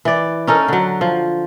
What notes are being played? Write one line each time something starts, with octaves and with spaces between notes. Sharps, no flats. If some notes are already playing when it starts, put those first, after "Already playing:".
E3 D5
C#4 D#4 A4 A#4
D3 F#3
F3